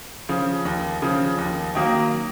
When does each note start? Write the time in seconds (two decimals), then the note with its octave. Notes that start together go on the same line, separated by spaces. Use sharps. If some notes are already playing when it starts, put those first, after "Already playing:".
0.29 C#3 F3
0.65 D#2
1.02 C#3 F3
1.38 D#2
1.75 D#3 F#3 A#3